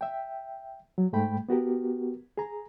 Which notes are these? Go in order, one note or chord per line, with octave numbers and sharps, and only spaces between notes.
E5 G5
F#3
G#2 G#3 A3 G5 B5
B3 F#4 G4 A#4
G#4 A#5